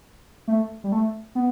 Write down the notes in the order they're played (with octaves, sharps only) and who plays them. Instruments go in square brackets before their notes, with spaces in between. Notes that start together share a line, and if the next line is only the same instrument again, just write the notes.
[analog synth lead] A3
G3
A3
B3